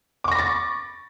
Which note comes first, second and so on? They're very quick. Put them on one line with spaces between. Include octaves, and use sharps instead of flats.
D6 C#6 A#6 B5 A6